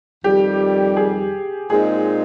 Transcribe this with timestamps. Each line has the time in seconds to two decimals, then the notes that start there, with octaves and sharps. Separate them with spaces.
0.24 F2 D#3 G3 G4
0.97 G#4
1.70 A#2 G#3 C4 D#4 G#4